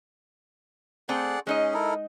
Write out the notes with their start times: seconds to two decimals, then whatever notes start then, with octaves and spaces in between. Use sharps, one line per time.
1.09 A3 C4 G#4 D5 F#5
1.47 G#3 C#4 D#4 G#4 D#5
1.74 E4 A4 A#4